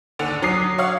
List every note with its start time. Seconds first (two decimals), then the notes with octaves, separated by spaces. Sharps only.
0.19 D#2 D3 D4 F#5 F7
0.42 F#3 D6 D#6 C7
0.78 C#5 F5 F#5